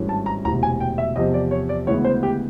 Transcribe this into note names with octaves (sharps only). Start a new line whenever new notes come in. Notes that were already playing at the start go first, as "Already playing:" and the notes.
Already playing: G#1 G2 E3 A3 C#4
A5
A#5
E1 D2 C3 E3 A#5
G#5
G5
E5
E2 C3 F3 D#5
D5
C#5
D5
D2 C#3 E3 G#3 B3 C#5
C5
G4